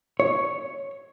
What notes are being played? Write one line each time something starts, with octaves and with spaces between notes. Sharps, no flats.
C#5